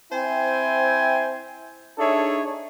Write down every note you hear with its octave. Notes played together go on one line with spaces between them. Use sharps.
C4 E4 C5 E5 G5 G#5
D4 D#4 G#4 A4 C#5 E5